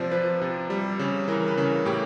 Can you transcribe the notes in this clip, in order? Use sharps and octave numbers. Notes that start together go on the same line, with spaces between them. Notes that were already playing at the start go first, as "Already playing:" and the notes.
Already playing: C3 F3 C5 D5
F3 B4
C3
G3
C#3
E3 A#4
B4
C#3
A2 G4